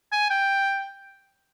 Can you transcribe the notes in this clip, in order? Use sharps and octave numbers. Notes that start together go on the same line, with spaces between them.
G#5
G5